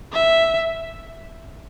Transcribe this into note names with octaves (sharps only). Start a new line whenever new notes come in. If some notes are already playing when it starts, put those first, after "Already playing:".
E5